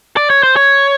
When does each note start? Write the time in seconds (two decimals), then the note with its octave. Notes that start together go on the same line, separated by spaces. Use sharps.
0.17 D5
0.30 C#5
0.43 C5
0.56 C#5